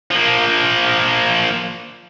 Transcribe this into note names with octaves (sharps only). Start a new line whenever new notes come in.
F3 A#3